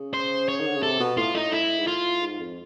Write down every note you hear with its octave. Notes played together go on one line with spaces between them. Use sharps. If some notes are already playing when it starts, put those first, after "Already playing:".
Already playing: C#3
C5
C#5
D#3
D3
C#3
C3 A4
B2
A2 F4
A2 D#4
A2 E4
G#2
A2 F4
G#2
F2